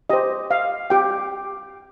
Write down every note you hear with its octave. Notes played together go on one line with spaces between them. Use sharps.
G4 C5 D#5
F5
G4 G5